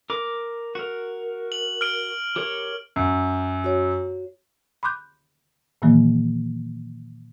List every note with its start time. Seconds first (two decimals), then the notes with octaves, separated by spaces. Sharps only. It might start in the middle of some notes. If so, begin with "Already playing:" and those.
0.10 A#4 D6
0.75 F#4 A#4
1.52 F#7
1.81 F6 D7
2.36 G4 A#4 C#5
2.96 F#2
3.64 F#4 C#5
4.83 B5 C6 D6 F#6 G6
5.82 A#2 D#3 E3 F#3 A#3